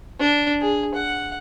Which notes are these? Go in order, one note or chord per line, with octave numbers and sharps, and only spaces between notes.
D4
G#4
F#5